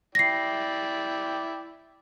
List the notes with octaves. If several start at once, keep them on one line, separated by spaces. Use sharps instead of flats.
E4 D5 G5 A#6 C7